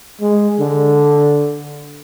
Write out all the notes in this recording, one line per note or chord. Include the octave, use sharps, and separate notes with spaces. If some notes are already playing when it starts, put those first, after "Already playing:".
G#3
D3